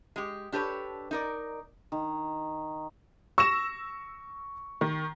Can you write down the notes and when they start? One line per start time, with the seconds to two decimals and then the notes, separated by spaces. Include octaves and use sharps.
0.16 G#3 G4
0.52 D4 G4 A4 B4 C#5
1.11 D#4 A#4 D5
1.92 D#3
3.38 C#6 E6 A#6 E7
4.81 D#3